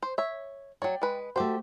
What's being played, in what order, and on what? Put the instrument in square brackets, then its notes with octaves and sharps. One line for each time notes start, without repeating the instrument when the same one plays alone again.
[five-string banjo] C5
C#5 E5
[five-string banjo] F#3 C#5 [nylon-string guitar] D5 G5
[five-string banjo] G#3 B4
[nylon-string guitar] A3 F#4 [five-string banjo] G4 C5